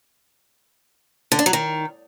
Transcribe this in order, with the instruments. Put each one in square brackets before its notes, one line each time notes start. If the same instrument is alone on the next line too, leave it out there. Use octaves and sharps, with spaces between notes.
[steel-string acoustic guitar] D3
D4
F#3
D#3